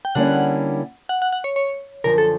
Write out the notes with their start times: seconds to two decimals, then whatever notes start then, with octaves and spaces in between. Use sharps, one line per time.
0.05 G5
0.15 D3 G3 A#3 C#4 E4 F#5
1.09 F#5
1.22 F#5
1.33 F#5
1.44 C#5
1.56 C#5
2.04 F#2 D3 F3 A#4
2.18 A4